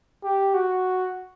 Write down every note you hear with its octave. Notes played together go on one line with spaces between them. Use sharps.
G4
F#4